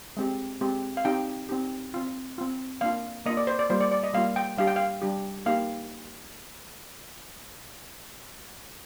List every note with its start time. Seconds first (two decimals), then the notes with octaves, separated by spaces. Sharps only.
0.17 G#3 C4 G4
0.61 G#3 C4 G4
0.97 F5
1.05 C4 D#4 G4 G5
1.49 C4 D#4 G4
1.94 C4 F4
2.38 C4 F4
2.81 A#3 D4 F4 F5
3.26 A#3 D4 F4 D#5
3.37 D5
3.47 C5
3.59 D5
3.70 G3 A#3 F4 C5
3.80 D5
3.91 D5
4.03 D#5
4.14 G3 A#3 F4 F5
4.36 G5
4.58 G3 D4 G4 F5
4.67 G5
4.76 F5
5.02 G3 D4 G4
5.46 A#3 D#4 G4 F5